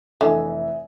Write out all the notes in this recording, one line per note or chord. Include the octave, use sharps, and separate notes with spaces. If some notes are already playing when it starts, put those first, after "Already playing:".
F1 D3 E3 D#5 E5 G#5